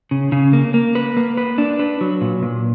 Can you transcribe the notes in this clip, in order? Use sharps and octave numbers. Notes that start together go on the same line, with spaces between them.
C#3
C#3
A#3
A#3
B4
A#3
B4
D4
B4
F#3
A#2
A#2